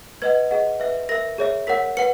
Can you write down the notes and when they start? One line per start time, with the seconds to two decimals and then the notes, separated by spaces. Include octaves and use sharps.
0.22 B4 D#5 F#5 G#6
0.51 G#4 D#5 F#5
0.80 B4 E5
1.09 A#4 E5 A#6
1.38 G#4 C#5 E5
1.67 A#4 C#5 F#5 B6
1.97 B4 F#5 C#7